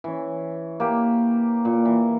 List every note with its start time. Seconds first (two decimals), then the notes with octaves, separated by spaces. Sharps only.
0.04 E3 C#4
0.80 A#3 G4
1.65 A#2
1.85 E3